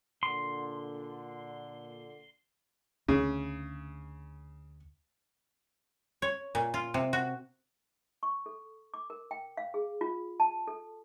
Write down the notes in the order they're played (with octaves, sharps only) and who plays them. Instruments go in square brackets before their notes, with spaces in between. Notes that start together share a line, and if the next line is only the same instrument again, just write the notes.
[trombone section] A#2 D3 [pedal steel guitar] C6
[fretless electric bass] D2 [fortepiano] C#3
[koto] C#5
A#2
F4
C3
F#4
[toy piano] C#6
A4
D6
A#4
G5
F5
G#4
F4
A5
A4